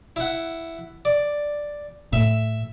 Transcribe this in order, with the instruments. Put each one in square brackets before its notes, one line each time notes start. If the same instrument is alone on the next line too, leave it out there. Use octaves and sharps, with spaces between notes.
[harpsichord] E4 F#5
D5
[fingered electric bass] A2 [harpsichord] E5